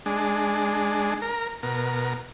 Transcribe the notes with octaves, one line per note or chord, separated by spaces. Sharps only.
G#3 D4
A#4
B2 A#4